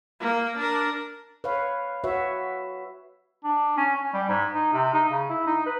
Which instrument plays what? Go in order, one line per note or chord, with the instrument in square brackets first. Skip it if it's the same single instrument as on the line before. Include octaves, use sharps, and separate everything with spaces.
[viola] A#3
D4 A#4
[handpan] B4 C#5 F5
F#4 B4 C#5 E5
[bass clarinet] D4
C#4
C#4
G3
G#2
D#4
C3
D#4
C#3
E4
D#4
B4